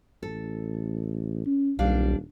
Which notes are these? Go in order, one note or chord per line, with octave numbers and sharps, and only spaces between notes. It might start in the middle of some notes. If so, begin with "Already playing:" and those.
A1 A4
C#4
D#1 B1 G3 D4 F5